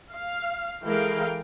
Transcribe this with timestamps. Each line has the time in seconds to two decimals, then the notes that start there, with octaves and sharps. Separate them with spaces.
0.11 F5
0.84 E3 G#3 A4 A#4 F5 G5